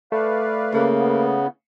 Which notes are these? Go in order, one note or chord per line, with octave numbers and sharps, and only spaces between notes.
A3 B4 D5 F5
C#3 A#3
B3